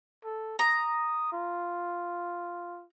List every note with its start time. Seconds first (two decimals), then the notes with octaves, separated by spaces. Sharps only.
0.24 A4
0.59 A#5 D#6
1.32 F4